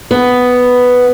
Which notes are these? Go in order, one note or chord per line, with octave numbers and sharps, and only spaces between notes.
B3